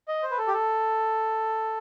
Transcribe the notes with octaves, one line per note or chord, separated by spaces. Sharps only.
D#5
C5
B4
A4
G4
A4